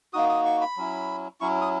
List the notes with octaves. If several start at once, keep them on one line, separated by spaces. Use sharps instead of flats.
A#3 D#4 F#4 D#6
D#6
C#6
B5
F#3 C#4 E4
F#3 C#4 E4 C#6
D#6